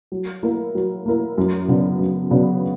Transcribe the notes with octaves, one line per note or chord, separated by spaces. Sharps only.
F#3
A#3 E4 A#4
F#3
A#3 E4 A#4
F#2
C#3 F#3 B3 D4
F#2
C#3 F#3 B3 D4